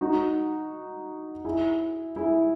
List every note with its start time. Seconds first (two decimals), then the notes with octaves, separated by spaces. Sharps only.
0.01 D#4 F#4
1.45 E4 G#4
2.16 E4 G#4